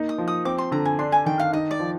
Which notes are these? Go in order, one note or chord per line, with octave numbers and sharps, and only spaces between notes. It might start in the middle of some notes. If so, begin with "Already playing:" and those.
Already playing: A#3 D#4
D#6
F3
D#6
C4 D6
C6
D3 A#5
G#5
D4 C6
G#5
D#3 G5
F5
D#4 D#5
D5
F3